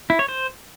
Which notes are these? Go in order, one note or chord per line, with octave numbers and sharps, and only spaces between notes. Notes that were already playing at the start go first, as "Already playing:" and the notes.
E4
C#5
C5